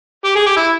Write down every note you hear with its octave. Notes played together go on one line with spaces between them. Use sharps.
G4
G#4
G4
E4